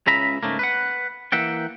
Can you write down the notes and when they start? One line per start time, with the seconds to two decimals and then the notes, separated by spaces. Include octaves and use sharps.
0.07 C#2 C#3 E5 A#5 B5
0.43 G#2 C#3 A3 A#3
0.59 B4 F#5
1.32 E3 A#3 E5 F#5 G5